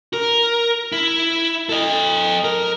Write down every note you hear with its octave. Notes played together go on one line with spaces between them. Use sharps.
A#4
E4
A4 D#5
A#4